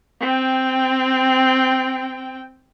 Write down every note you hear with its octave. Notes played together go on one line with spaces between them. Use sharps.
C4 G5